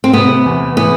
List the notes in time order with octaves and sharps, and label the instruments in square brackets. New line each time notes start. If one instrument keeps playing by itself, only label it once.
[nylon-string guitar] C4
[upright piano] C3 [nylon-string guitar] B3
[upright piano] E2
[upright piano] E3 [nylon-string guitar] B3